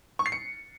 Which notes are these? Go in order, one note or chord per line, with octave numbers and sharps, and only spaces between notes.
C#6
C7
C#7